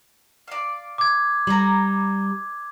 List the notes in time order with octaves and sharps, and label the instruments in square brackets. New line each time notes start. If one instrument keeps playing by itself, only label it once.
[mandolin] D5 F5
[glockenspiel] D6 G#6
[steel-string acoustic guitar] G3 [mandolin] A#5 B5